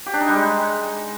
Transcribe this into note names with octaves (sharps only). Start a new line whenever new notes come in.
G4
D4
D#4
G3
G#3